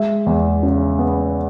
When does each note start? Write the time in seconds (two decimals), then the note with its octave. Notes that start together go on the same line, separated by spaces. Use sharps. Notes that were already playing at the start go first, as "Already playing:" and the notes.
Already playing: G#3 E5
0.26 E2
0.63 C#3
0.99 B3